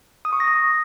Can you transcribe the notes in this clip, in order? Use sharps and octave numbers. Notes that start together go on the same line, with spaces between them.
D#6
C#6
A#6
D#6